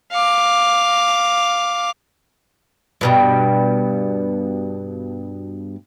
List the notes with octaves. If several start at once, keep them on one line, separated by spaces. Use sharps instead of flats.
F5 D6
G2 B2 G3